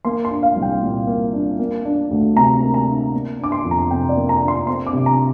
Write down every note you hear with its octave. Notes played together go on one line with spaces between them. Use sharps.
A#3 C6
C6
D4
F5
C2
G5
A#2
A#3
D4
A#3
D4
D2
C3 A#5
A#3
A#5
D4
A#3
D4 D6
C6
F2
A#5
C3 G5
D5
A#3
A#5
D4
C6
C4 C6
D6
C3
A#5